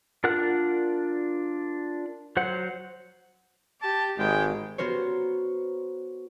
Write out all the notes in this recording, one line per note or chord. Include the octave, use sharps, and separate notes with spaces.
D4 F4 A#4 F#5 F#6
F#3 C5 F#5
G4 A5
G#1 G#3 G5
B3 F#4 A#4 C5 C#5